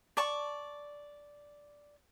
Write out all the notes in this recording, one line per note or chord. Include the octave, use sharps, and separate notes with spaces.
D5 A5 C#6